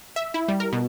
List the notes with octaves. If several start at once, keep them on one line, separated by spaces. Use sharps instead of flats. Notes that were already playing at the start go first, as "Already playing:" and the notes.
E5
E4
G3
A#4
B2